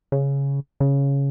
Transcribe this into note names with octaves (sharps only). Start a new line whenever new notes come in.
C#3
C#3